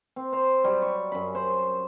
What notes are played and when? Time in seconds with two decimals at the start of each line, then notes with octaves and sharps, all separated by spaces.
0.16 C4
0.33 C5 A#5
0.64 F#3 G3
0.82 C#6
1.12 F#2 B5
1.35 C5